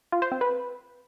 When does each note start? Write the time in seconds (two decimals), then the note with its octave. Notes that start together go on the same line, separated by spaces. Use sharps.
0.12 F4
0.22 C5
0.32 C4
0.41 B4